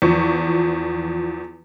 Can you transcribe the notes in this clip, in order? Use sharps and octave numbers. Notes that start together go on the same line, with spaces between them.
E2 F3 C#6